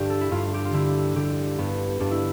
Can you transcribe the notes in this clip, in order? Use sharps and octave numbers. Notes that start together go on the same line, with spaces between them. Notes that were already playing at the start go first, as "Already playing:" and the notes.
Already playing: G2 D3 G4
A4
E4
G2 F4
G4
F4
D3 E4
D3 G4
G2 B3
G2 D4
E4